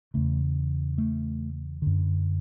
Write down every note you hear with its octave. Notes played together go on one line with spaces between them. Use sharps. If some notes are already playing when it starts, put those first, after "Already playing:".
E2 C#3 A3
A3
F#2 D3